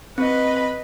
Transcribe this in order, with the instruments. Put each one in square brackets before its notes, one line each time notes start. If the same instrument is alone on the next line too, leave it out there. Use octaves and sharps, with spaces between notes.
[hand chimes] C4 [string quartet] B4 D#5 B5